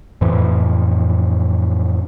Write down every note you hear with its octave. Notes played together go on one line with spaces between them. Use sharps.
F2 A2 E3